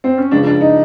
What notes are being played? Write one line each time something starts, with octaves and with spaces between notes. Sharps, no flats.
C4
C#4
C#2 C#3 F3 D4
D4
D#4